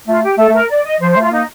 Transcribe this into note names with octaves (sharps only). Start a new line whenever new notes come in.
A3 F4
G4
A3 A4
A3
A#4
D5
D#5
F3 C5
C5
A3 F4
A#3 D#4